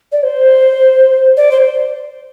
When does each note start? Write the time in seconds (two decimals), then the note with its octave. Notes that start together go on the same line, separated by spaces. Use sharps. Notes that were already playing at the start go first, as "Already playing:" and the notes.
0.12 D5
0.23 C5
1.37 D5
1.51 C5